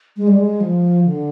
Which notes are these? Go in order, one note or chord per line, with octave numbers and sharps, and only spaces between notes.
G#3
G3
G#3
F3
D3